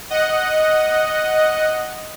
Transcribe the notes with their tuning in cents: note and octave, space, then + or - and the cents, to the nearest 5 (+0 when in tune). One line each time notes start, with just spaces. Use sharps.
D#5 +0 F#5 +0